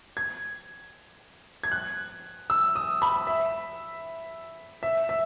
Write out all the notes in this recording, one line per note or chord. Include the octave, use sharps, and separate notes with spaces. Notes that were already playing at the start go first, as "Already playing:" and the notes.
G#6
G#6
F#6
E6
D#6
B5
E5
E5
E5